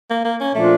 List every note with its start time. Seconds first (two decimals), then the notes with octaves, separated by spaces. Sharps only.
0.10 A#3
0.25 A#3
0.41 C#4
0.55 A#2 F3 A3 A#3 D4 F4